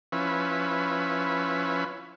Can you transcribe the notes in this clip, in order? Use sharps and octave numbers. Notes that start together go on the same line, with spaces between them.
F3 C#4 E4 B4